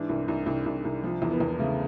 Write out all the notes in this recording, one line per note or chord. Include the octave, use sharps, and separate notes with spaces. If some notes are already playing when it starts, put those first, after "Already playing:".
Already playing: G#2 E3 D4
C2
C2
C2
C2
C2
F3
E2
B3
E2
C#3 A3